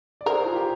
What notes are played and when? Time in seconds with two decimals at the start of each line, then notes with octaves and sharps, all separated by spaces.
0.21 D5
0.26 G#4 A#4 C5
0.45 F4
0.55 G4